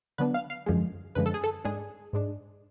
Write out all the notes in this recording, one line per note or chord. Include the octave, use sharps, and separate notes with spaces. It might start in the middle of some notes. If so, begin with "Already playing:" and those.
D3 F#3 B3 D4 B4
F5
F5
F#2 D3 F3 G#3
F#2 D3 F3 G#3 B4
A4
G#4
A4
G#2 G#3 D4 G#4
G#2 G#3 D4